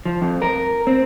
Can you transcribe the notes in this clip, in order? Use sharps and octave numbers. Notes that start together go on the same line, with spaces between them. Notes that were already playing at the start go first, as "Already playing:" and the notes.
F3
F2
A#4
C4